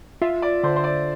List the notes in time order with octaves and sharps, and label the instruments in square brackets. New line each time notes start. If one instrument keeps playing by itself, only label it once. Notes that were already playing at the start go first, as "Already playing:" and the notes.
[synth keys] F4 [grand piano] E5
[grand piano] D5
[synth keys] D3 [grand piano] C5
[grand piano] C5
D5